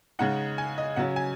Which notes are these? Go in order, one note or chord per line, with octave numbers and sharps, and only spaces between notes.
C#3 G#3 D#4 F#5
G#5
D#5
C#3 F#3 C#4 F#5
G#5